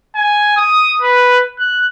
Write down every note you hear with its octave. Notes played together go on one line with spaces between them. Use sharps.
G#5
D#6
B4
F#6